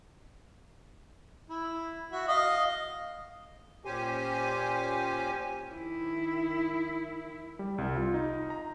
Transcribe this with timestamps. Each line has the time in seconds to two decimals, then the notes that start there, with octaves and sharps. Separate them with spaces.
1.50 E4
2.12 F#4 E5
2.28 D#5 F5 D#6
3.85 A#2 C#4 G4 C5 G#5
5.71 D#3 E4
7.59 G3
7.78 C2
7.96 F4
8.14 D#4
8.50 A#5